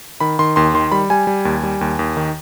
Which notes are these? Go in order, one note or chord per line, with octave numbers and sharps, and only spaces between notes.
D#3 B5
D#3 C6
D#2 C6
D#3 C6
G3 B5
G3 G#5
G3
D#2
G3
D#2
D#2
D#3